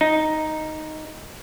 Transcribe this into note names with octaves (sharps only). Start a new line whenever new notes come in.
D#4